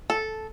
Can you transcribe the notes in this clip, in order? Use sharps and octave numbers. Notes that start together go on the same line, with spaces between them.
A4